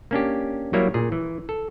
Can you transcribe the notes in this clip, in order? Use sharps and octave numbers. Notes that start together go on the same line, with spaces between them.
A#3 C#4 D4 G4
F#3 G3 A#3 E4 C#5
A#2 G#4
E3
A4